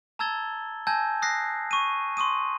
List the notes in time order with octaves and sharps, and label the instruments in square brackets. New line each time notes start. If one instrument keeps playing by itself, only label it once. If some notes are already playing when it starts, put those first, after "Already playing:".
[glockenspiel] A5 A#5 E6 G#6 A6 G7
G#5 A5 E6 G6 G#6 A#6
D#6 F#6 A#6 C7
C#6 D#7
C6 C#6 D#6 D#7